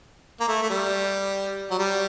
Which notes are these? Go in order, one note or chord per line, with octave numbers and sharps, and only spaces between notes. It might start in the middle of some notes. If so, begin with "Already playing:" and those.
A#3
A3
A3
G3
F#3
G3